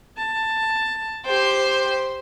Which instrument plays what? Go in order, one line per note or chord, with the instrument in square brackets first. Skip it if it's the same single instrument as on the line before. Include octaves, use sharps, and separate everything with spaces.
[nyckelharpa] A5
[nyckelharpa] G4 G5 [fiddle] C5 C6